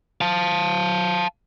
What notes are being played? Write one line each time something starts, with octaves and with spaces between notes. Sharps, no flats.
F5 A5